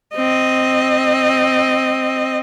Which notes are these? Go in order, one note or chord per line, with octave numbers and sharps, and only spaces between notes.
C4 D#5